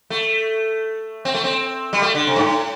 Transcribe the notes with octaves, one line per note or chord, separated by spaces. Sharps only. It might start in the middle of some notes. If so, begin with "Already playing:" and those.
A3
C4
A3
C4
G3
A3
D3
C3
G2
A2